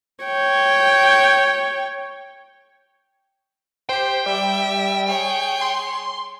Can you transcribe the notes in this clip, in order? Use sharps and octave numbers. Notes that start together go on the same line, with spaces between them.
C#5 G5
G4 C5 G5
G3 E5
G#4 C#5
C6